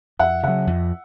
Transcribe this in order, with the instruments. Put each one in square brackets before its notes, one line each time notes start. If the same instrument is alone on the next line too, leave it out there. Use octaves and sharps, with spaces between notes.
[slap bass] F2 [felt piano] E5 F#5
[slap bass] C#3 F#3 [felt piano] E5 F#5
[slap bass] F2